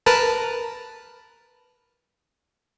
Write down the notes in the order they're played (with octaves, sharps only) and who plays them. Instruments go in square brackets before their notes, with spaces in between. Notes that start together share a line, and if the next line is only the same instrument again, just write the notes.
[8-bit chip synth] A#4 B4 A5